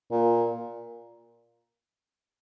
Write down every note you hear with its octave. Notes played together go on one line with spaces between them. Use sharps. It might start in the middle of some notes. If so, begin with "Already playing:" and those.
A#2